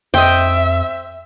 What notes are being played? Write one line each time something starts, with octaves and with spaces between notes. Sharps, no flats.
F2 C5 D#5 E5 G5